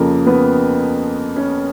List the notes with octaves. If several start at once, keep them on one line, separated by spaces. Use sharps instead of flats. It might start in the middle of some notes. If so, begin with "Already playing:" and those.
Already playing: F2 C#3 F3 A#3 A#4
B3 B4
C#4 C#5